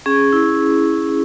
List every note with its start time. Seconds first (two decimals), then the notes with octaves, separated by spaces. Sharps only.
0.06 C#4 G#4
0.33 E4